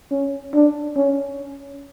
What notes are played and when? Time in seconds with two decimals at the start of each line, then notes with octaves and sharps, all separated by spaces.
0.11 C#4
0.54 D4
0.96 C#4